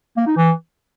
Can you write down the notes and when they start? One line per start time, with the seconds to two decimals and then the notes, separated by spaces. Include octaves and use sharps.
0.17 A#3
0.27 D#4
0.36 E3